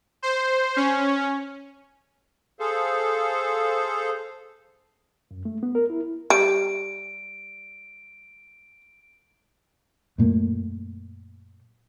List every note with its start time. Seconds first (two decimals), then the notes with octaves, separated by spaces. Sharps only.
0.22 C5
0.76 C#4
2.60 G#4 A4 C5 F5
5.31 F#2
5.45 A3
5.63 B3
5.75 A#4
5.90 E4
6.30 G3 D7
10.18 F#2 A#2 A3 A#3